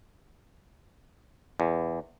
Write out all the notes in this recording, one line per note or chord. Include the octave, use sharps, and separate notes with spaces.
E2